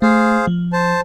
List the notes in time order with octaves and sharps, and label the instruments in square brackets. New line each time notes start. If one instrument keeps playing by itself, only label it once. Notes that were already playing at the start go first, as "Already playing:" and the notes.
[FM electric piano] A3 [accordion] G#4 C5 F5
[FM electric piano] F3
[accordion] C5 A5